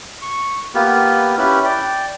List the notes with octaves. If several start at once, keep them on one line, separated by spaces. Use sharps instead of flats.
C#6
A#3 B3 F4 G4
C#4 E4 G4 B4
D5 G5